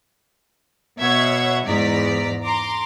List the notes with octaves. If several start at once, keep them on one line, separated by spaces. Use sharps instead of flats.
B2 C#5 E5 F#5 G#6
E2 G#2 D5 A#5 B6
A#5 C6 D6